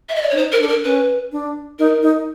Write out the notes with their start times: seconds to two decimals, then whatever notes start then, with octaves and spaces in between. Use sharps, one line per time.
0.09 E5
0.15 D#5
0.22 D5
0.29 C#5
0.32 D4
0.36 D#4 C5
0.52 A#4
0.60 D4
0.63 A4
0.68 A#4
0.84 C#4 B4
1.32 D4
1.79 D#4 A#4
2.02 D#4